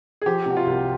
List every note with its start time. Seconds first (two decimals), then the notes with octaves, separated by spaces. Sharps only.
0.22 G#4
0.26 F3 G4
0.46 C3 F#4
0.57 F4
0.66 C2